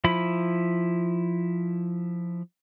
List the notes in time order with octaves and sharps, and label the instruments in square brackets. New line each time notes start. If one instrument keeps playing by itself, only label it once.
[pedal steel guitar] F3 E4 B5